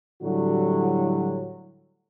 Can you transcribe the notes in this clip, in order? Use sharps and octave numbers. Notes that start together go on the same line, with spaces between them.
A2 D3 F#3 G3 E4 F#4